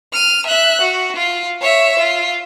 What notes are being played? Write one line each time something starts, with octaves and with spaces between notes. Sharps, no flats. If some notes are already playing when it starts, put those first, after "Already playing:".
F6 D#7
E5 F#6
F#4
F4
C#5 E5
F4